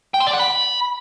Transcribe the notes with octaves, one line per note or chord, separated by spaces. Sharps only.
G5
C6
D5
F#5
B5